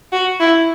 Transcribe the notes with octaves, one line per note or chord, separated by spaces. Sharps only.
F#4
E4